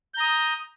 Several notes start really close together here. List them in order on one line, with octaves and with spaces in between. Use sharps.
G6 A#5 D#6